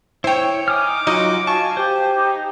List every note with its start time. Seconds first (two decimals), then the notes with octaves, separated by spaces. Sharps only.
0.24 E4 C5 C#5 G5
0.68 D#4 G#5 D6 D#6 F6
1.07 F#3 D#4 F4 F#4 D#5
1.47 F5 G#5 A5 C#6
1.77 G4 C5
2.16 D#4